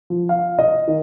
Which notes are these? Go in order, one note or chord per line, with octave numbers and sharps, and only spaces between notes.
F3
F5
D#5
D#3